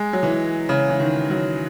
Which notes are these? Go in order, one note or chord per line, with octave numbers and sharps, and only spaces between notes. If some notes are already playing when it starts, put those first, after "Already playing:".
Already playing: G#3
F#3
E3
C#3
E3
D#3
F#3